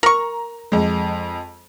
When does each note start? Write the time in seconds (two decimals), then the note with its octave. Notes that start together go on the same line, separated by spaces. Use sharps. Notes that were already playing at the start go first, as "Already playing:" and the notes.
0.03 A#4 A#5 C#6
0.72 F2 G#3